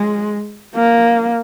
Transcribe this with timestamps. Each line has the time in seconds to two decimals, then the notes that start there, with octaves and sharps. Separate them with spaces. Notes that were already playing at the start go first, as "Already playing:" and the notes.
Already playing: G#3
0.75 A#3